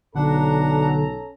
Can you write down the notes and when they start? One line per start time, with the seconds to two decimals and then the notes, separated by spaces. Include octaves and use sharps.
0.15 B1 D3 C#4 D4 A4 F#5 A#5